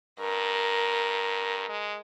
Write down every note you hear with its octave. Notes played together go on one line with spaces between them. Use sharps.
G2 A#4
G#3